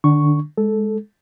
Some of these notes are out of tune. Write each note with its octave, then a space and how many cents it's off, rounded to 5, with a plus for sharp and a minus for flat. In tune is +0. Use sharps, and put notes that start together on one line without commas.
D3 +40 D4 -10 C#6 +0
G#3 +0 A4 -10